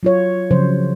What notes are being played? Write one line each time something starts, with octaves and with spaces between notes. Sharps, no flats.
F#3 F4 C#5
C#3 F3 F#3 C5